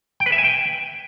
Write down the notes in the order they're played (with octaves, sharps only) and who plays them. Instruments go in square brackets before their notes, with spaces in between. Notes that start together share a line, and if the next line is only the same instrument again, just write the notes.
[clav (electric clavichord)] G5
B4
E5
G#5
G5